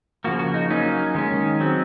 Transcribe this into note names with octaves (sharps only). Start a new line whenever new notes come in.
C#3 F3 A#3 F#4
F#4
D#4
F#3 A#3 C#4 D#4
D#3 G#3 C#4
F#3 C4